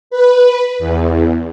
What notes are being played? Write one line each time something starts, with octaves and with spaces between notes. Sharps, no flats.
B4
E2